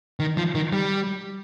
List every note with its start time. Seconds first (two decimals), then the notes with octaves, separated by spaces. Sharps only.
0.20 D#3
0.37 F3
0.55 D#3
0.73 G3